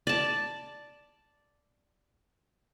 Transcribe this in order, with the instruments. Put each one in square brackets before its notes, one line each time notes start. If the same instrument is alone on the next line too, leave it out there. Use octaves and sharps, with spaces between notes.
[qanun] D5 A5